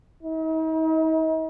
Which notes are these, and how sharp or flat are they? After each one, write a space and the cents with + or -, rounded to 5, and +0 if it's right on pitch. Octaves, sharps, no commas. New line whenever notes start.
D#4 +45